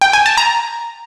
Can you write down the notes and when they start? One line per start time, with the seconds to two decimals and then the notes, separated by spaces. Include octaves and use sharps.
0.01 G5
0.13 G#5
0.26 A5
0.37 A#5